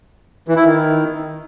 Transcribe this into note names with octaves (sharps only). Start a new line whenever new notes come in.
E3
E4
D#3